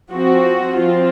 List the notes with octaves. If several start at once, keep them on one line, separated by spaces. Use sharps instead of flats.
F3 C4 F#4
F3 C4 F4